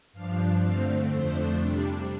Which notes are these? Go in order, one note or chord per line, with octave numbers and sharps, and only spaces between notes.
G2 F3 D4 F5
D3 A3 C4 F5
F2 F3 A3 D4 C5
C3 G3 D4